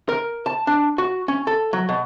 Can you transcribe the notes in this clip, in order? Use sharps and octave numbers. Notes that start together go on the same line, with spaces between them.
A#4
A5
D4
F#4
C#4
A4
F#3
B2